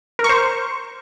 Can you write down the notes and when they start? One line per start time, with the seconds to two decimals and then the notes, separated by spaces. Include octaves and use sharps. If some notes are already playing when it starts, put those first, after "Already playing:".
0.19 A#4
0.24 C#6
0.29 C5